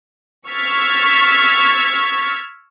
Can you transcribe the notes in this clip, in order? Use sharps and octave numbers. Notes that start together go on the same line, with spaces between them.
C#6 E6 F6 G#6 A6 B6